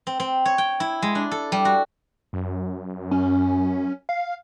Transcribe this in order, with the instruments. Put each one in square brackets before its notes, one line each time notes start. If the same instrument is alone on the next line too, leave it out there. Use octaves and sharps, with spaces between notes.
[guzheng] C4
C4
C#5
G5
E4
G#3
D4
A4
G3
F#4
[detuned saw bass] F#2
[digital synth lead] C#4
F5